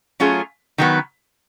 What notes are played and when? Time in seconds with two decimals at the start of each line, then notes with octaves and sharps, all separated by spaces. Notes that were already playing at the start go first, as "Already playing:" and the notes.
0.20 F#3 A3 C#4 F4 G#4
0.78 D#3 F#3 B3